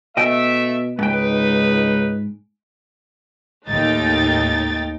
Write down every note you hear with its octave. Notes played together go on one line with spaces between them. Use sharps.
B2 A3 D#5 E5 G5
C#2 G#2 D#4 B4 G5
D#2 A2 D#4 G5 A6